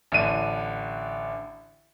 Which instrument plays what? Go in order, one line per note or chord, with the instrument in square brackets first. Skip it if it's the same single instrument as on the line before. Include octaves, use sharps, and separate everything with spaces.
[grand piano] A1 D3 D#7